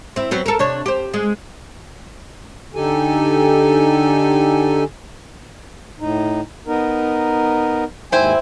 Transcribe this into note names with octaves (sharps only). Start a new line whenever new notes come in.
C4 E4
F#3 B3 C4
A4 A#4
C3 D4 C#5
G4 C5
G#3
D3 D#4 G4 A4 G#5
A2 D#4
B3 D#4 A#4
D#2 G#2 C4 E4 C5 G#5